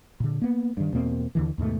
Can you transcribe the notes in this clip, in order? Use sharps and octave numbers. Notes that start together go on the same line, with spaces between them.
A#2 D3
A#3 B3
G2 D#3
E2 B2 A#3 C4
D#2 D3 E3
D#2 G#2 B2 A3